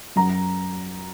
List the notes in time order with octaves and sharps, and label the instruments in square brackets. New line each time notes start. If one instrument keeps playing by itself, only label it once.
[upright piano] F#2 F#3 A#5